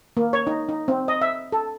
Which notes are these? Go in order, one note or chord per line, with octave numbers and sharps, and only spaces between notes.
A#3
C#5
D#4
D#4
C4
D#5
E5
A4